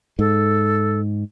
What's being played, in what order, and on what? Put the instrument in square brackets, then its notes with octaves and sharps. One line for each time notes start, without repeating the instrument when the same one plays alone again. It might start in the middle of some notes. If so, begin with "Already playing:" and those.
[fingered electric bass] G#2 [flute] A4